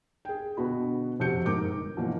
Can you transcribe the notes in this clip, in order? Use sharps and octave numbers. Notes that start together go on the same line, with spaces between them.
G#4 G5
B2 D3 B3 F#4 B5
F2 C3 F#4 G6 C#7
G#2 A#4 D6 G6
G1
B2 E3 F3 A#3